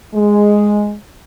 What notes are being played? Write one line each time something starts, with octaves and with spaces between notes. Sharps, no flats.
G#3